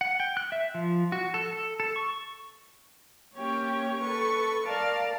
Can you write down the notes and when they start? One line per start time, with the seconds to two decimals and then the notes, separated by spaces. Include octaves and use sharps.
0.01 F#5
0.20 G5
0.37 F#6
0.52 E5
0.74 F3
1.12 F#4
1.34 A4
1.53 A4
1.80 A4
1.96 C#6
3.35 A#3 C#4 G4 C#5 G5
4.02 A4 B4 C#6
4.67 A#4 D5 F5 A5